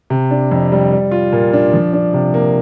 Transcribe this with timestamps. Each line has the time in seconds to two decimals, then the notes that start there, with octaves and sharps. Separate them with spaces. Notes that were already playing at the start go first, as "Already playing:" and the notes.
0.10 C3
0.31 D4
0.52 F2
0.72 G3
0.92 G3
1.11 F4
1.32 A#2
1.53 D4
1.74 F3
1.93 D4
2.13 C3
2.34 A#3